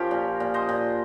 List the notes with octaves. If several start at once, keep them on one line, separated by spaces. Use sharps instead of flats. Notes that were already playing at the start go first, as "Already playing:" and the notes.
Already playing: F3 C#4 F4 G4 A#4
A#2
A#2
C5 D#5
A#2